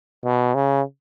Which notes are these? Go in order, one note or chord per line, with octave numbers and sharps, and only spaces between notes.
B2
C#3